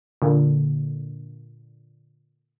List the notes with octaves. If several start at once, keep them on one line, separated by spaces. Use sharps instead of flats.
A#2 D3